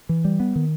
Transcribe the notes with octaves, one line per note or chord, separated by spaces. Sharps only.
E3
G3
B3
D#3